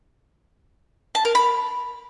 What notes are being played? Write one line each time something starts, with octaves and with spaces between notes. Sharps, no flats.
A5
A#4
B5